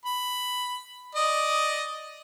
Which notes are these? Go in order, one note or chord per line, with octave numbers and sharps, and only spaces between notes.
B5
D5 D#5